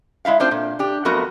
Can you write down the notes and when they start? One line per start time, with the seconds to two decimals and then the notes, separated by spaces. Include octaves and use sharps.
0.25 G#3 E4 E5 F5
0.40 A3 C4 D4 F4 C5
0.51 A#2
0.79 D4 G4
1.05 F2 F#3 A3 B3 F#4 A#4